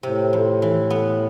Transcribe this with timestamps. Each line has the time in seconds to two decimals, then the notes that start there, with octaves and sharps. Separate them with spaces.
0.03 A2 C3
0.33 F2
0.62 E3
0.90 B3